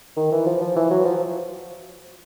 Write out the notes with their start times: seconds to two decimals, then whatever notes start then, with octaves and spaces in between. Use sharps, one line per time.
0.17 D#3
0.32 E3
0.46 F3
0.61 F3
0.76 E3
0.91 F#3
1.05 F3